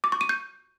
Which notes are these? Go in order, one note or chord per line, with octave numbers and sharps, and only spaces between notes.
D6
C#6
D#7
G6